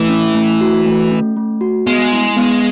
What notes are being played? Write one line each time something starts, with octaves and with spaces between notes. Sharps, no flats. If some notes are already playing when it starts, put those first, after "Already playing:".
Already playing: E3 A3
C#4
A3
F#4
A3
C#4
A3
F#4
G#3 B3
E4
B3